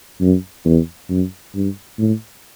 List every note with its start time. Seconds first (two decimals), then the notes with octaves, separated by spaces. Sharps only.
0.21 F#2
0.65 E2
1.10 F#2
1.55 G2
1.99 A2